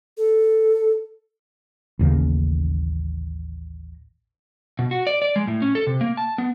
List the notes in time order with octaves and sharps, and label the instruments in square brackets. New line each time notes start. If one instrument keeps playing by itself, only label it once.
[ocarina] A4
[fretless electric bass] A1 D#2 C#3 A#3
[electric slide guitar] B2
F#4
D5
D5
G#3
A2
C#4
A4
C3
A#3
A5
B3